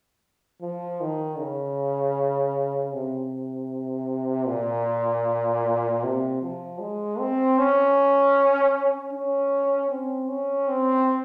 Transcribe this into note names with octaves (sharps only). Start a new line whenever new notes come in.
F3
D#3
C#3
C3
A#2
C3
F3
G#3
C4
C#4
C#4
C4
C#4
C4